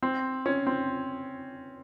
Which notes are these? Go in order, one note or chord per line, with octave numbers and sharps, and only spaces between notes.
C4
C#4
C4